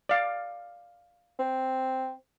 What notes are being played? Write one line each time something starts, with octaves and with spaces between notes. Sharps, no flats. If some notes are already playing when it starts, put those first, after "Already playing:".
D5 F5
C4